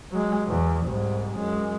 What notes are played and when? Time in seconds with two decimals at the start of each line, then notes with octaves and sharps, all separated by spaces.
0.12 F#3 G#3
0.48 E2
0.86 C2 G#2
1.36 F#2 G#3